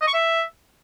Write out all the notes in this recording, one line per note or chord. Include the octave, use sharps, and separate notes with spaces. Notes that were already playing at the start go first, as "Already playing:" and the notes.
D#5
C#6
E5